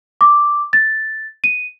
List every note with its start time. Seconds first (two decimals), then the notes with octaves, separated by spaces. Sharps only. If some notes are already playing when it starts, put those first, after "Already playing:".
0.21 D6
0.73 A6
1.44 D#7